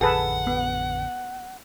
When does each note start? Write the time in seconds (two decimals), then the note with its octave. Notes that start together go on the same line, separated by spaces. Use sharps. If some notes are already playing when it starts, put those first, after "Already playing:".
0.01 A1 F2 D3 G#4 A4 B4 F#5
0.47 B3